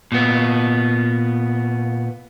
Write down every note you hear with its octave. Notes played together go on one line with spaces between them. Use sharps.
A#2 B3